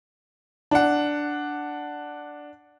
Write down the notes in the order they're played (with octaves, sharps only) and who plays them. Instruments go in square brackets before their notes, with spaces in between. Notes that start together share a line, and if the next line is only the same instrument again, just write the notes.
[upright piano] D4 F#5